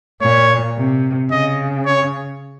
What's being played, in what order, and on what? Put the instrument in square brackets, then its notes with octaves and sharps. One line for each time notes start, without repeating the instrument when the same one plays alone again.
[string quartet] A#2 [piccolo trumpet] C#5
[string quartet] C3
[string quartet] C#3 [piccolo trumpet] D#5
[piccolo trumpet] C#5